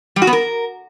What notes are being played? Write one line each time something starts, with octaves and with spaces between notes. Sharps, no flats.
G3
F#4
B3
A#4